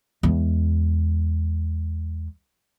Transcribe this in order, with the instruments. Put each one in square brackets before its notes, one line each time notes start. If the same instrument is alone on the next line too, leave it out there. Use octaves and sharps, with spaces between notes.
[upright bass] E2 G#3